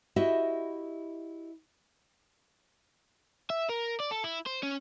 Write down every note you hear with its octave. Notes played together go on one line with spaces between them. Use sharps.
E4 F#4 G4 D#5 E5
E5
A#4
D5
A4
E4
C5
C#4